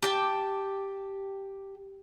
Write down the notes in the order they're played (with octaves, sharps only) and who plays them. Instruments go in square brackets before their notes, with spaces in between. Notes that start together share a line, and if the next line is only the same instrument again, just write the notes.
[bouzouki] G4 G5 A5